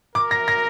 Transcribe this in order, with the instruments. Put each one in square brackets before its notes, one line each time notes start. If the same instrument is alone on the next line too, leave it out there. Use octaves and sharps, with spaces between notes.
[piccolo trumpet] A#4 [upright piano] D6
[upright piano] A#6
A#6